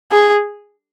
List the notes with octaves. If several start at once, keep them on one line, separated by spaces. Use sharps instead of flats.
G#4